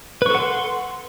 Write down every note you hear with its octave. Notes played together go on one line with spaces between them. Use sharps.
A4 B4 F#5 C6 C#6